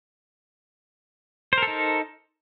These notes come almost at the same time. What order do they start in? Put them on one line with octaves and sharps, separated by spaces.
C5 A#4 A4 D#4